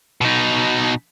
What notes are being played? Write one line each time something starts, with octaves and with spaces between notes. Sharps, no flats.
B2 D#4